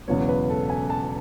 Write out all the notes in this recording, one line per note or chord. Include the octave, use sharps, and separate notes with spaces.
E1 E2 C#3 F#3 B3 C#5
B4
A4
G#5
A5